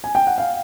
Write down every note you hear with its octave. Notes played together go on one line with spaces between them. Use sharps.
G#5
G5
F#5
F5